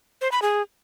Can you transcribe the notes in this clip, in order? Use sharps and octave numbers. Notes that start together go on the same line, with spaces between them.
C5
B5
G#4